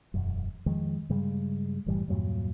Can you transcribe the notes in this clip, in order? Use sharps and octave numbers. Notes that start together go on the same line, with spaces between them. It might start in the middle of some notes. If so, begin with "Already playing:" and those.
E1 F#2
F2 D#3 F3 G#3
G2 C#3 G3 G#3
F#1 A2 E3 G3
E2 G2 A#2 F#3